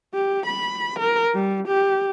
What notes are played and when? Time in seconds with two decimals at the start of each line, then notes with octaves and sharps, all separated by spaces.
0.14 G4
0.46 B5
0.99 A#4
1.34 G3
1.68 G4